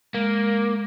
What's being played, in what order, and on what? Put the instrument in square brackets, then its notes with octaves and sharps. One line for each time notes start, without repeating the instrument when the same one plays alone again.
[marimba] G#3 [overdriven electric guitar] A#3